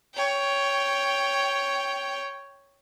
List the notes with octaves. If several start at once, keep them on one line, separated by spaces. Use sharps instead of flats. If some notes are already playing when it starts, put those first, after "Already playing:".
C#5 G5